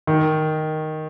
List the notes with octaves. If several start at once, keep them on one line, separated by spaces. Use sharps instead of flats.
D#3